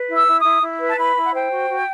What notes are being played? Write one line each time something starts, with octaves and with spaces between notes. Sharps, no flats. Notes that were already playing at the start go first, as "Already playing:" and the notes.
Already playing: B4
E4
E6
E4
D#6
E4
E4
B4
A5
E4 B5
E4
F#5
C5 G5
F#4
F#4